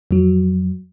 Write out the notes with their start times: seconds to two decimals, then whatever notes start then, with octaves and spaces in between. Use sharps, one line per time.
0.11 F2 F#3